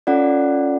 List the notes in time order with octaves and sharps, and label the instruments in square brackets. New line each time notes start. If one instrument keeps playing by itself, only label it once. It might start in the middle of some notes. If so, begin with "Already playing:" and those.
[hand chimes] C#4 F4 A4 D5 F#5